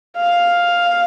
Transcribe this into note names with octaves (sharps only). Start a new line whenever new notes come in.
F5